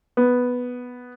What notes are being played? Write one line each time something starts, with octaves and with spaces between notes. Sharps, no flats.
B3